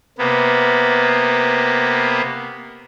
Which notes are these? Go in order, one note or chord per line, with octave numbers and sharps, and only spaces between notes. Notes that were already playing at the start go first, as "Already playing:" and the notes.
C3 A#3 B3